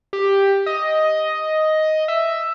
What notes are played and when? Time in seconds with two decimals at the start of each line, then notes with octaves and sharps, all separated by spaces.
0.13 G4
0.66 D#5
2.08 E5